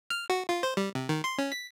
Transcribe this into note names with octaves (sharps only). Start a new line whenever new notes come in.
F6
F#4
F4
C5
G3
C3
D#3
C6
C#4
B6